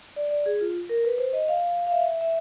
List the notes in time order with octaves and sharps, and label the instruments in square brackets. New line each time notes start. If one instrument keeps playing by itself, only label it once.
[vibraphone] D5
D5
G#4
F4
A#4
B4
C5
D#5
F5
F5
E5
E5